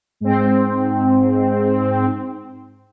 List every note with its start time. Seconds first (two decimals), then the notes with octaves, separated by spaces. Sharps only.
0.20 G#2 C4